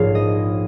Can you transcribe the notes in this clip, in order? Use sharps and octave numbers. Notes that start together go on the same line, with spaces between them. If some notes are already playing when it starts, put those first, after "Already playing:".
Already playing: A#1 G#2 F3 C#5 F5
D#5